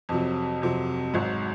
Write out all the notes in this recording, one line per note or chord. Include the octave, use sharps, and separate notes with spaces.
F2 C3 F#3
F2 C3 F#3
G#1 G#2 F#3